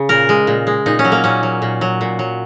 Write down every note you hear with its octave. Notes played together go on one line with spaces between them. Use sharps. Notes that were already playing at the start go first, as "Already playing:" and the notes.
Already playing: C#3
A#2 A#4
G#3
A#2
G#3
A#2 D#4
C#4
F#3
A#3
A#2 C#4
F#3
A#2
F#3
A#2
F#3